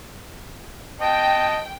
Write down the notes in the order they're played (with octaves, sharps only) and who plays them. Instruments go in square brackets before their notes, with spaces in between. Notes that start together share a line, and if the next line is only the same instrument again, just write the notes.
[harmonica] D#5 A5 [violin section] G5